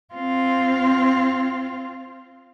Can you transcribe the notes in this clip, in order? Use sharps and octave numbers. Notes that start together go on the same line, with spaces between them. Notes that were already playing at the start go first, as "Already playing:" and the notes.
C4 F4